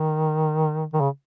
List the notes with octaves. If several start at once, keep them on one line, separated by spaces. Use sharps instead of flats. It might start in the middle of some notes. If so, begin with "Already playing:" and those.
Already playing: D#3
D#3
C#3